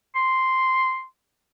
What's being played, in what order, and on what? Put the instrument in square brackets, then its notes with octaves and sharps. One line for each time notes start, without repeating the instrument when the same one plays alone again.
[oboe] C6